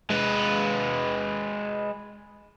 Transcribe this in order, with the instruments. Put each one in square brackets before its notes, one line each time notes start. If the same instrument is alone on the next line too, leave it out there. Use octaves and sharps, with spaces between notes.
[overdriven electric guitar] G#3 B4